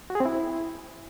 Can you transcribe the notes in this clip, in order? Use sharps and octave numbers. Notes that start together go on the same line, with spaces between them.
F#4
G#4
C4
E4